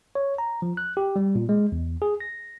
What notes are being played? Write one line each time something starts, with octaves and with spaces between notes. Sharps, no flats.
C#5
A#5
F3
F#6
G4
G3
A#2
G#3
E2
G#4
A#6